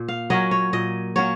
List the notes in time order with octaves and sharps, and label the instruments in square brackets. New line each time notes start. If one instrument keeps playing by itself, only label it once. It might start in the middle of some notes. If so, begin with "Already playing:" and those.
Already playing: [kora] A#2
F5
F#3 A#3 C#4 D#5
C#5
A#2 D#5
F#3 A#3 C#4 C#5